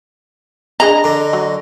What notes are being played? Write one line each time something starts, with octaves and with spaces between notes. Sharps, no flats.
D4 G#4 D#5 A#5 B5
D3
F#3